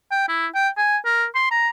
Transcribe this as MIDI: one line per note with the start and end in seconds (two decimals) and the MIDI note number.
0.11 0.27 79
0.28 0.47 64
0.55 0.69 79
0.77 0.97 80
1.05 1.25 70
1.35 1.49 84
1.51 1.69 82